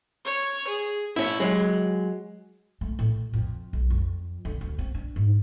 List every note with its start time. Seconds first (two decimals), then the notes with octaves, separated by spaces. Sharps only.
0.25 C#5
0.67 G#4
1.16 C#4 E4
1.40 F#3 G#3
2.81 A3
2.99 A2
3.33 F2
3.73 B1
3.90 F2
4.45 D3
4.61 D2
4.78 C4
4.95 D4
5.16 G#2